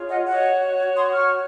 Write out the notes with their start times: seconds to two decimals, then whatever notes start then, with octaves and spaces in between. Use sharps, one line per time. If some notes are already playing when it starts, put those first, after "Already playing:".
Already playing: F4 G#4 C#5
0.10 D#5 F#5
0.27 F#4 C#5 D#5 F#5
0.95 C6 D#6
1.12 C#6 F6